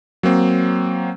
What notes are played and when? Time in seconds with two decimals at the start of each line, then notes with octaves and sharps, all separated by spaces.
0.23 F#3 A#3 C4